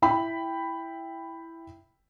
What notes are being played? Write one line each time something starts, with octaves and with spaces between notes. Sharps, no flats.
E4 G5 B5